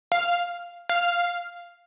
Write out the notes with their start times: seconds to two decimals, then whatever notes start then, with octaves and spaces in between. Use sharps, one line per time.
0.12 F5
0.89 F5